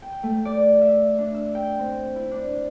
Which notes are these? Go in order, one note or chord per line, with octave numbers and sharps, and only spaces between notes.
G5
A3
D5
E5
D4
E6
G5
C4
E4
D4